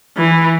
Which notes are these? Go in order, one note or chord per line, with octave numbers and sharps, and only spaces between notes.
E3